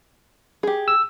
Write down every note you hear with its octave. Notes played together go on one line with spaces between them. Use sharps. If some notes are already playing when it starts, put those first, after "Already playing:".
G4 G#4
E6